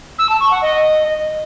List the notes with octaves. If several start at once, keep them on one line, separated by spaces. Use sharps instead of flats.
E6
A5
C#6
F#5
D#5